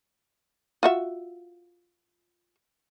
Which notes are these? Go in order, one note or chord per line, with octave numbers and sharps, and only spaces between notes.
F4 F#4 E5